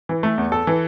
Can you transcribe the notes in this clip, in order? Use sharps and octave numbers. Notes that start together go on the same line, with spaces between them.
E3
A3
E2
A4
E3